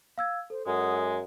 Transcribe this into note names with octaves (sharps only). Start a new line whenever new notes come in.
F5 E6 G#6
A4 C5
F#2 G#3 F#5 D#6